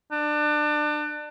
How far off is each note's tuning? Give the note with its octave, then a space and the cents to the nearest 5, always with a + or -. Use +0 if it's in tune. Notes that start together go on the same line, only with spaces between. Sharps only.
D4 +30